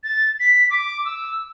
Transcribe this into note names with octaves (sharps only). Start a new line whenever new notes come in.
A6
B6
D6
E6